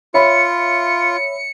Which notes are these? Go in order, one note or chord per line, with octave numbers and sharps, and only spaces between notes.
F4 C#5 E5 B5 C#7